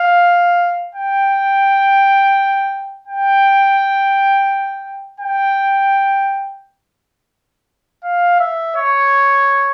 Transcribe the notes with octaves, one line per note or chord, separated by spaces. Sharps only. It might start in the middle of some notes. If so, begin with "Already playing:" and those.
Already playing: F5
G5
G5
G5
F5
E5
C#5